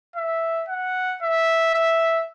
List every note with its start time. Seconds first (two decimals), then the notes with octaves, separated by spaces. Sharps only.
0.16 E5
0.68 F#5
1.23 E5
1.75 E5